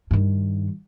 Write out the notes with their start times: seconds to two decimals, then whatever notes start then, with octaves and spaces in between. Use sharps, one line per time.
0.11 G2 D#3